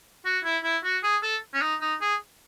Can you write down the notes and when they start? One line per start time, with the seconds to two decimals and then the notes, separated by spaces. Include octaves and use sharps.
0.25 F#4
0.44 E4
0.64 E4
0.84 F#4
1.03 G#4
1.23 A4
1.54 C#4
1.61 D#4
1.81 D#4
2.01 G#4